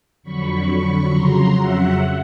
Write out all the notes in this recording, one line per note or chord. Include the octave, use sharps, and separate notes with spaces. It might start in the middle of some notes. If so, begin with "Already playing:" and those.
F2 D3 F#3 B5 C#6
F2 C#3 F#3 A#5 C6
E5 F#5